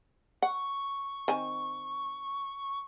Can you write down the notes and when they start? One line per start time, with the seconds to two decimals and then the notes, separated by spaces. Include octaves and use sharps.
0.42 F#5 C#6
1.28 D#3 C4 G#5